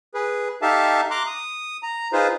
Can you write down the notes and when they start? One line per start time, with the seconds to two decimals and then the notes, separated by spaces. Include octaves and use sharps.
0.14 G#4 B4
0.62 D#4 G4 A4 E5 F5 A5
1.11 A#5 C6 D6 F#6
1.27 D#6
1.83 A#5
2.13 D#4 F4 G#4 B4 C5